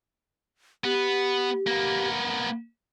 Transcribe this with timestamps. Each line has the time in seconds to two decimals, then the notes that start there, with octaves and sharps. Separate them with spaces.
0.84 B3 G4
1.67 A#3 B3